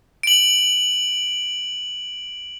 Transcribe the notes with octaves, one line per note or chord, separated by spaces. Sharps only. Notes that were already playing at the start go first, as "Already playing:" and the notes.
D7 F#7